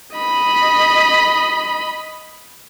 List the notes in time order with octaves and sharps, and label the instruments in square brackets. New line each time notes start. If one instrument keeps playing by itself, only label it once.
[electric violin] D#5 B5